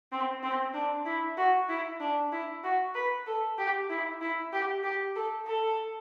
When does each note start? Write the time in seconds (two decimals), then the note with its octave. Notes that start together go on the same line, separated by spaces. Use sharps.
0.12 C4
0.43 C4
0.74 D4
1.06 E4
1.37 F#4
1.69 E4
2.00 D4
2.32 E4
2.63 F#4
2.95 B4
3.26 A4
3.58 G4
3.89 E4
4.21 E4
4.53 G4
4.84 G4
5.15 A4
5.47 A4